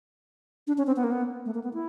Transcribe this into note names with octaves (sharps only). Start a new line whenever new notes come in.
D4
C#4
C4
B3
A#3
B3
A3
A#3
B3
E4